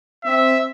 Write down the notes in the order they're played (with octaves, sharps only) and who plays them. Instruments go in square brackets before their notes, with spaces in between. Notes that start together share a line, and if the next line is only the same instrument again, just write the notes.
[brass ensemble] C4 [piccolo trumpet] E5